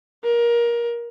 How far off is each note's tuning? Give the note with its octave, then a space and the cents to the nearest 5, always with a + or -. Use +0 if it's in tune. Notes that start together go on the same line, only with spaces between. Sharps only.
A#4 +20